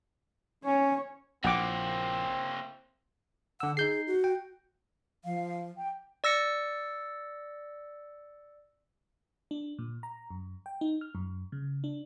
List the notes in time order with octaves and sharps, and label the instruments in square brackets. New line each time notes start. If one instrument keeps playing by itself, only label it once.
[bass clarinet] C#4 [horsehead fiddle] C#5
[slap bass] A#1 [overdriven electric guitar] A#3 E4 [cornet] C4 [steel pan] F#5 G5 D6
[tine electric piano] D3 E6 [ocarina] F#5
[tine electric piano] D#4 G6 C7 [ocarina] G#4
[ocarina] F#4
[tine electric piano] G5
[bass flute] F3 [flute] F5
[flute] G5
[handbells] D5 E6 A#6 C#7
[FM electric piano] D4
A#2
A#5
F#2
G5
D#4
F6
F#2
C#3
D4